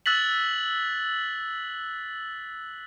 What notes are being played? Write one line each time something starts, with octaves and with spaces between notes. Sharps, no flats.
E6 F#6 A6 B6 F#7